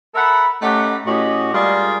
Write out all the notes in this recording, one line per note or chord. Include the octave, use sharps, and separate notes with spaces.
A4 A#4 E5 F#5 B5
A3 C#4 D#4 G4 F#5
A2 C#4 F#4 G4 D#5
G3 G#3 F4 G#4 A#4 D5